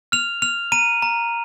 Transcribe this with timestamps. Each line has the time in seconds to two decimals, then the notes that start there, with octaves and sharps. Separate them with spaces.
0.12 F6 F7
0.42 F6 F7
0.72 A#5 D#7
1.02 A#5